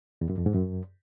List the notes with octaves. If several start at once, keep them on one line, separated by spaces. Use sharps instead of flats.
E2
F#2
F2
G#2
F#2